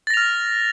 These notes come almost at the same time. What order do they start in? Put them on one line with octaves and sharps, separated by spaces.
A6 A#6 F7 F6